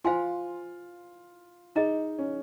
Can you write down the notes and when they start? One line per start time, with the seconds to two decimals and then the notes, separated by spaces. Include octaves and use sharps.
0.04 F4 C5 F5 G#5 C6
1.76 D#4 G#4 D#5 A#5
2.18 C#4